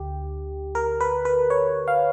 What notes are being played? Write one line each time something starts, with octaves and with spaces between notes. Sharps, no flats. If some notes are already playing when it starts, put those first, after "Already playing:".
Already playing: D2 D3 G4
A#4
B4
B4
C#5
F5